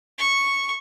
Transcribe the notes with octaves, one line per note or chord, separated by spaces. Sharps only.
C#6